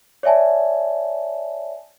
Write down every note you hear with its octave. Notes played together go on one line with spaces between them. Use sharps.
C#5 D5 E5 G#5 A5